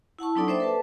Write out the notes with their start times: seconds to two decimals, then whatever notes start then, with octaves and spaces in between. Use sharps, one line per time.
0.19 E4 F#5 A5 C#6
0.35 F#3 C4 D4 D#4 A4 D5
0.48 A#3 C5 D5 E5 G5 D6
0.60 A4 B4 A5